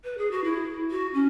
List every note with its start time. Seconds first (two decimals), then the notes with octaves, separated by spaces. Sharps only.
0.04 B4
0.18 G#4
0.31 F#4
0.44 E4
0.91 F#4
1.14 C#4